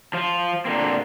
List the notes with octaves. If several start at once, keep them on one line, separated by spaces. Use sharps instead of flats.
F3 F4
A#2 D3 A#3 C4